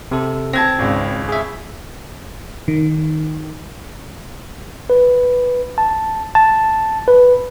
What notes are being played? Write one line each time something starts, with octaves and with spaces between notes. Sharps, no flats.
C3 A4
C4 A5 G#6 A#6
G#1 C#2
G#4 E5
D#3
B4
A5
A5
B4